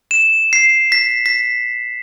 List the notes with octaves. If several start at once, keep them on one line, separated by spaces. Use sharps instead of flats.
E7
C7
B6
B6